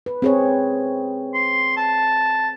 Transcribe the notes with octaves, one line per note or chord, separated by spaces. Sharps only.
B4
C4 G#4 C#5
C6
A5